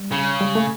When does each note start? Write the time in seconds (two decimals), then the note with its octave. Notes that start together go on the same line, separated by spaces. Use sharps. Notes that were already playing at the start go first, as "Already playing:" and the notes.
Already playing: G3
0.12 C#3
0.41 G3
0.55 A3